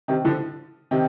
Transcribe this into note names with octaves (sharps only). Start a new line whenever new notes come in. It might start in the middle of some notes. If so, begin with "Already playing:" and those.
C3 D#3
D3 F3
C3 D#3